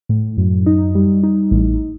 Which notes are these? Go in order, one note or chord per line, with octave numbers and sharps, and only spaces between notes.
A2
F#2
D#4
G3
D#4
A1